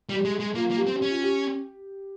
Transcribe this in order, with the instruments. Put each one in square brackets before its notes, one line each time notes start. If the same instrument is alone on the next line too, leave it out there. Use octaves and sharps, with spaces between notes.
[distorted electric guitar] G3
[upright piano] G4
[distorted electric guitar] G#3
G#3
[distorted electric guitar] A#3 [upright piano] F4
[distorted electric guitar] A#3
[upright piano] G4
[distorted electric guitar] C4
[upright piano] G4
[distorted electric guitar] C#4
[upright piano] F4
G4